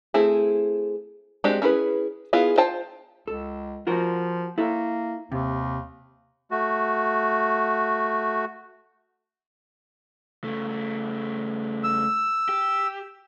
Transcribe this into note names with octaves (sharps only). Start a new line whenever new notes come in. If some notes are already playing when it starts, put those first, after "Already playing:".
A3 C4 E4 G#4
G#3 C4 D4 F#4 G4
C#4 E4 G#4 A#4 B4
B3 E4 F4 G#4
F4 C5 G5 A5
C#2 A4
F3 F4 F#4 A#4
A#3 E4 A4
D#2 C3
A3 F#4
C#3 A3
E6
G4